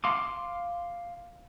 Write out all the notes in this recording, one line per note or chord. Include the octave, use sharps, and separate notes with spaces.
F5 C6 D6